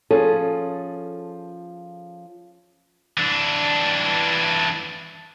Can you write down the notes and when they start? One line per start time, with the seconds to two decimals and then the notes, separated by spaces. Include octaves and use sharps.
0.11 F3 C#4 G#4 A4
3.18 E3 D4